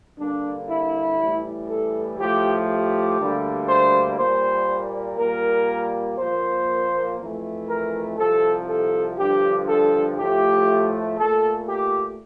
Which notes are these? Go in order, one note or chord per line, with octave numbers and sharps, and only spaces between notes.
G2 D3 G3 A#3 D4
E4
A2 E3 G3
A4
A2 F3 A3 G4
G4
D2 D3 G3 A#3
C5
A#2 G3 A#3 C5
A#2 G3 A#3 A#4
A#2 F3 A#3 C5
F2 E3 A3
A#4
C2 C3 F3 A4
A4
G2 D3 F3 G4
A4
A2 F3 A3 G4
A#2 A3 A4
G4